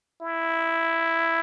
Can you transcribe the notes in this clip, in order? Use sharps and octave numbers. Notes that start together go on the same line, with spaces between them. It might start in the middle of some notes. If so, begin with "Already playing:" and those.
E4